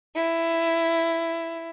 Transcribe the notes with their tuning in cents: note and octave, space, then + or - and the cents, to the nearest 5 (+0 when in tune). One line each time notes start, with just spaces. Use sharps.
E4 +10